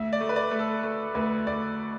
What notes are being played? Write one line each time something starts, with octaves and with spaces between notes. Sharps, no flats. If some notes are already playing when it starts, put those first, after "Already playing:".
Already playing: D2 E5
D5
A3
B4
D5
A3
A4
A3
D2 B4
D2 D5